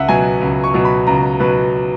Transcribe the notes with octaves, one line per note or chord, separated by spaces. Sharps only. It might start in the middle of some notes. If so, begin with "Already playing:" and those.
Already playing: C#2 E5 F#5
B2 F#3 G#5
C#2
C#6
B2 F#3
B5
C#2 A#5
B2 F#3 B4